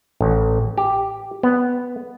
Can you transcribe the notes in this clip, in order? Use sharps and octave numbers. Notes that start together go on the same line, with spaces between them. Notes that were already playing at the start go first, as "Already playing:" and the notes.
A1
G4
B3